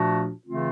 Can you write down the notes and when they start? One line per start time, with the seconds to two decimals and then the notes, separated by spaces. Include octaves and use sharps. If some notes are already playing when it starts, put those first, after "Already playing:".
Already playing: A#2 F3 A3 D4 F#4
0.46 C#3 E3 A3 C4 F4